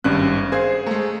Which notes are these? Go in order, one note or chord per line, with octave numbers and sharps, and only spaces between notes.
G#1 G2 C#4 F#4 F#6
G#4 C5 F5 G#6
G#3 A3 A#5